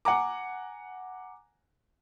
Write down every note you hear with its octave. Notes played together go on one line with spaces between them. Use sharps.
F#5 G#5 A#5 D6